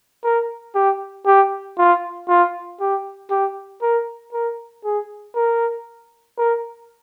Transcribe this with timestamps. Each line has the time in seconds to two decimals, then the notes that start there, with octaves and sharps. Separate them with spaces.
0.24 A#4
0.75 G4
1.26 G4
1.78 F4
2.28 F4
2.80 G4
3.30 G4
3.82 A#4
4.33 A#4
4.84 G#4
5.36 A#4
6.38 A#4